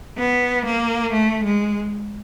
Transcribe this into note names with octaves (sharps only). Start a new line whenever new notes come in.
B3
A#3
A3
G#3